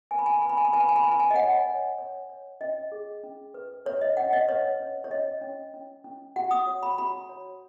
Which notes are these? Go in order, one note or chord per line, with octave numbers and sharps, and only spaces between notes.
B4 G#5
B5
G#5
B5
B4 G#5
B5
G#5
B5
B4 G#5
B5
G#5
B5
B4 G#5
B5
G#5
D#5
C#5 F#5
C#5
C#5
C#5
C#4 D#5
G#4
C#4
B4
B4 C#5
D#5
C#4 F#5
D#5
B4 C#5
C#4
C#5
C#4 D#5
C#4
C#4
C#4
F#4 F#5
D#6
C#5
B5
F#4 B5
C#5